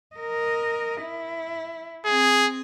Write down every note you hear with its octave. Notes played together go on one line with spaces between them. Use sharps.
A#4 D#5
E4
C4 G#4